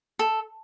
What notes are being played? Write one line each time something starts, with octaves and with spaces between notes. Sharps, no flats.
A4